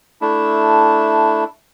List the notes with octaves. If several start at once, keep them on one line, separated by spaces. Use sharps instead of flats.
A3 D4 E4